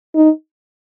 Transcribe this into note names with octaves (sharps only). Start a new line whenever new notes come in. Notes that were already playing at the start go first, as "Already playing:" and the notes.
D#4